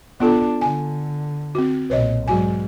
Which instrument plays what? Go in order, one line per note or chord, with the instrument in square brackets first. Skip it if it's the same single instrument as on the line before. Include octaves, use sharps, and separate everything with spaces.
[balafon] B3 F4 A4 [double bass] D4
[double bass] D3 [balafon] G#5
[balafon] C4 F#4
[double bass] B1 A#2 [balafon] B4 C#5 D#5
[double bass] G#2 [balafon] F#3 F#4 G#5